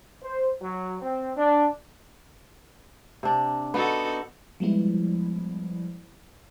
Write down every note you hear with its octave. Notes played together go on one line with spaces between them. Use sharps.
C5
F#3
C4
D4
C3 D4
B3 D#4 F#4 A4
F3 G3 G#3 B3 E4